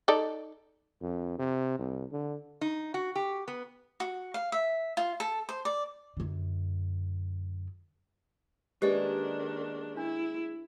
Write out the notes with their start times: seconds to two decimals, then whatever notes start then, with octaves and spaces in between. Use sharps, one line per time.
0.08 D#4 A4 D5
1.01 F2
1.38 C3
1.79 C2
2.12 D3
2.61 D#4
2.94 F#4
3.16 G4
3.48 B3
4.00 F#4
4.34 F5
4.52 E5
4.97 F4
5.20 A4
5.49 C5
5.65 D5
6.17 F#2 D3
8.82 D#3 G#3 A#3 C#4 D4 G4 B4 D5
9.97 D4 E4